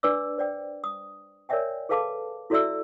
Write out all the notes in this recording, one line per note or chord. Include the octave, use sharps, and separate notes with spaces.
D4 B4 D5 D6 E6
C5 D5 G5
D#6
A#4 C#5 D5 E5 G5 G#5
G#4 A4 B4 F5 A5 D6
E4 F#4 A4 D5 E5 E6